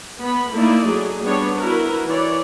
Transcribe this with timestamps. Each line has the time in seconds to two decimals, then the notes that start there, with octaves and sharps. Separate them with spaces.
0.21 B3 B5
0.53 A3 A#3 D#4 E4 D5
0.88 F#3 A3 G#4
1.24 G3 B3 D4 C#5
1.57 E4 F#4 A#4 B4
2.06 E3 C#5 D5